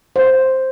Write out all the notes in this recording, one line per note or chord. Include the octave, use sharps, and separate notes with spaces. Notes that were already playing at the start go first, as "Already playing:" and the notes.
C5